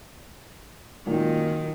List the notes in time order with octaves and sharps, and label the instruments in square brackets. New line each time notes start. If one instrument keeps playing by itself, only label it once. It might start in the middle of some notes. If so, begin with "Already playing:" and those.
[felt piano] F#2 A#2 [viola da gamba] D#3